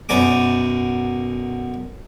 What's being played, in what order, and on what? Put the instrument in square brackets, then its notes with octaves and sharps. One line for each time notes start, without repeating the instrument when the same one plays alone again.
[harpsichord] B1 F#2 D5 G#5 D6